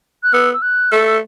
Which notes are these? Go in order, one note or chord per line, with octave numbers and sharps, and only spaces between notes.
F#6
B3 E6
E6
F#6
A3 E6
E6